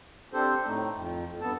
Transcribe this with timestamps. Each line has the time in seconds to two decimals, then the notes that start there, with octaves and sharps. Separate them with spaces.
0.33 C4 D4 G4 A4 C5
0.66 A2 A3 D#4
0.94 F2
1.27 F2
1.41 G2 B3 A4 A5